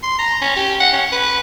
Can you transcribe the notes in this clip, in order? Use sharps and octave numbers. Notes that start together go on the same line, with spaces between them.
C6
A#5
C#4
G4
F#5
C#4
B4